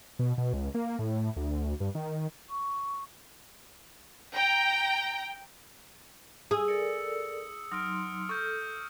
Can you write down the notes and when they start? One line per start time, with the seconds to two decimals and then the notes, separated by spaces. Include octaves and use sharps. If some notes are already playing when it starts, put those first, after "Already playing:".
0.19 B2
0.38 B2
0.53 C#2
0.74 A#3
0.99 A2
1.36 D2
1.80 G2
1.95 D#3
2.48 C#6
4.34 G5 A#5
6.51 G#4 D#6 E6
6.68 A4 A#4 D5 C#7
7.72 F#3 D#4 C6 D#6 F6 D7
8.29 A4 C#6 F6 G6